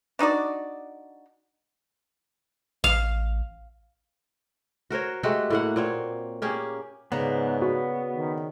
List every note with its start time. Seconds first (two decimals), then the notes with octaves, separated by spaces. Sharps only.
0.19 D4 D#4 F#4 D5
2.84 A1 F5
4.90 F#4 A#4 C5 C#5
5.23 G#3 A3 F#4 G4
5.50 A2 A#3 F#5
5.76 A#2 C4 C#5
6.42 A#3 C#4 G4 G#4
7.12 G#2 C#3 A#3 B3 D4
7.62 B3 F#4
8.17 D#3